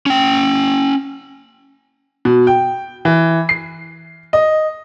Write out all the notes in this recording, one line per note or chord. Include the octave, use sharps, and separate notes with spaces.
C#4 G5
B2
G5
E3
C7
D#5